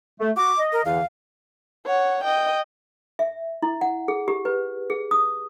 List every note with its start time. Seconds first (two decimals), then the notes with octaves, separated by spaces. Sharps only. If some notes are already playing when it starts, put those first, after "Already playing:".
0.20 A3
0.37 F#4 D6
0.59 D#5
0.72 A#4
0.85 E2 D3 E3 F5
1.86 C#5 F#5
2.24 D#5 G5
3.19 E5
3.63 E4
3.81 F#5
4.08 G#4
4.28 G4
4.45 B4
4.90 G#4
5.11 D#6